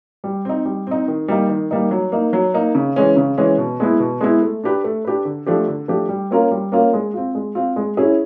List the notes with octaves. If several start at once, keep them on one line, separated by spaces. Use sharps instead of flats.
G3
C4 D#4
G3
C4 D#4
D#3
G3 A#3 D#4
D#3
G3 A#3 D#4
F#3
A#3 D#4
F#3
A#3 D#4
C#3
E3 G#3 C#4
C#3
E3 G#3 C#4
B2
G#3 B3 E4
B2
G#3 B3 E4
A3
D4 G4 B4
A3
D4 G4 B4
D3
F3 A3 D4 G4
D3
F3 A3 D4 G4
G3
A#3 C#4 F4 A#4
G3
A#3 C#4 F4 A#4
G#3
C4 F4
G#3
C4 F4
G#3
C#4 E4 G#4